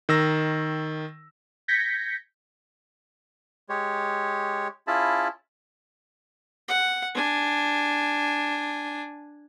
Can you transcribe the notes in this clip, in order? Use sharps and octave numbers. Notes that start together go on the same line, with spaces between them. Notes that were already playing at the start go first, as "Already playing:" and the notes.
D#3 E6 A#6
G6 G#6 A#6 B6 C#7
G#3 G4 C#5
C#4 E4 F4 G#4 A5 B5
F#5
D4 G#5